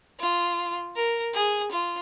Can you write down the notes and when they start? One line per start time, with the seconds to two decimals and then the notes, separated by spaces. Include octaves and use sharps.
0.20 F4
0.95 A#4
1.34 G#4
1.72 F4